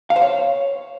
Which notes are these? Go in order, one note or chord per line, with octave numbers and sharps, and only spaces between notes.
F5
C5
C#5